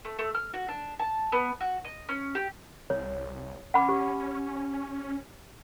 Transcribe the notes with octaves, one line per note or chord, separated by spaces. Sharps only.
A3
A3
F6
F#4
D4
A5
B3
F#4
D#5
C#4
G4
C2 C#5
C#4 F#5 B5 D6
G4